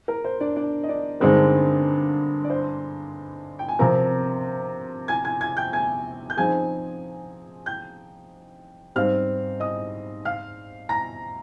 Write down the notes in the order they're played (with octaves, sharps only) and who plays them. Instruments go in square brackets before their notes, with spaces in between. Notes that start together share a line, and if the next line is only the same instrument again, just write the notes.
[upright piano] A#4
C5
D4 D5
D4 D5
D#5
D4 D5
[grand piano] G2 D3 G#3 C4 D#4 [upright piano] A#4
[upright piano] D5
C5
G5
G#5
[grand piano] C3 F3 C4 [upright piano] A#4 A#5
[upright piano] G#5 G#6
G#5 G#6
G#5 G#6
G5 G6
G#5 G#6
G6
[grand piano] F3 C4 D#4 G#4 [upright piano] G#5 G#6
[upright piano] G5 G6
[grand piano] G#2 G3 C4 [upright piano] F5 F6
[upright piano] D#5 D#6
F5 F6
A#5 A#6